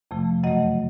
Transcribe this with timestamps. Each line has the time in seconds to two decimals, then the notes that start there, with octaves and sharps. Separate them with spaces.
0.11 F2 C3 F3 A3
0.43 F#2 C#3 F#3 A3 D#5 F#5